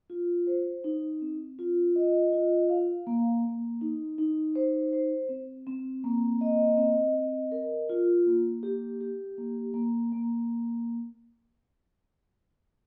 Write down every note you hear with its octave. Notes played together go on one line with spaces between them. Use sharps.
F4
C5
D#4
C4
F4
D#5
F4
F5
A#3
A#3
D#4
D#4
C5
C5
C4
C4
A#3
D#5
C4
D#5
A#4
F4
A#3
G4
G4
A#3
A#3
A#3